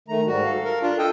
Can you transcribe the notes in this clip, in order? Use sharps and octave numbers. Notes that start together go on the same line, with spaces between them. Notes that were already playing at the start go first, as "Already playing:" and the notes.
D#3 A3 A#5
G#2 G3 F#4
A4 F5
A#4
D4 F4
A4 D#5 G5